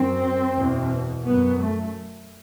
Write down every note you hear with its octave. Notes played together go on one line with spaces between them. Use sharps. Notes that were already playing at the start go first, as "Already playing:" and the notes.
Already playing: F#2 C4
E2 B2
F#2 B3
A3